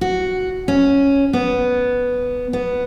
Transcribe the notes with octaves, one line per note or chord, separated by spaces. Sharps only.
F#4
C#4
B3
B3